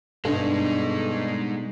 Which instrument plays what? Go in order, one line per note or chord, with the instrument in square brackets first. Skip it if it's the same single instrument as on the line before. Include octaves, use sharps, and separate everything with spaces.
[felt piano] G2 [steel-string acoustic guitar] B2 G3 [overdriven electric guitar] G#3 D#4 [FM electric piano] D4 A4